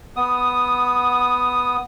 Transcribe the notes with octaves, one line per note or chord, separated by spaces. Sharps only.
B3 D#6